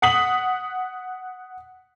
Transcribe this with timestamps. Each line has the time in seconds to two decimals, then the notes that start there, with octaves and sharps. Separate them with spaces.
0.02 F#5 D#6 B6 F#7